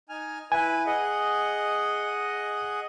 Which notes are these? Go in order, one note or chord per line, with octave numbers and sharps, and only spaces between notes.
D#4 G#5 F6
E4 B4 G#5
G#4 D#5 F#5